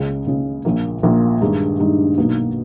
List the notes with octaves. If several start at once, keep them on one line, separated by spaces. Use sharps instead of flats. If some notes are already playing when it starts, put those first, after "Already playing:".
Already playing: C#2 C#3 G#3
C#2 C#3 G#3
A#1 A#2 A#3
A#1 A#2 A#3
G2 D#3 G#3 D#4
G2 D#3 G#3 D#4
B1 B2 A#3 D#4